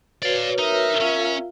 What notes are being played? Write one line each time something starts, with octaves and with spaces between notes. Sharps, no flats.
F#4 B4 C#5 D5 F5
D#4 A#4 E5
C#4 F4 F5